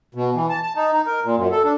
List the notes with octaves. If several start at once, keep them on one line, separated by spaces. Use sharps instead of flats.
B2
E3
A5
A5
D#4
D#4
A#4
A#2
F#2
A4
D4